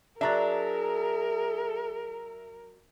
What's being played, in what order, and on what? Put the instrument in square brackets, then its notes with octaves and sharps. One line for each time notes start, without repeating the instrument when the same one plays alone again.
[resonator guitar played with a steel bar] F#3 D4 [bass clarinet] G#4 [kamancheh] A#4 [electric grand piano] E5 A#5 A6